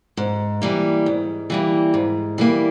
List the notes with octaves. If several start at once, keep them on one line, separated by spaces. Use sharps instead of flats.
G#2
E3 G3 A#3
G#2
E3 G3 A#3
G#2
E3 G3 A#3